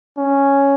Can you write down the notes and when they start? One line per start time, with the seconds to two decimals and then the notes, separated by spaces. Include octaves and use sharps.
0.18 C#4